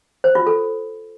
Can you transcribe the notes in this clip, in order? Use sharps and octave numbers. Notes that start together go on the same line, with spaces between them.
C5
F4
A4